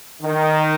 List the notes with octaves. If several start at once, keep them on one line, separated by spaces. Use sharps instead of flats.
D#3